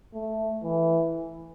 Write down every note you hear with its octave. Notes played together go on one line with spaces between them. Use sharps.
A3
E3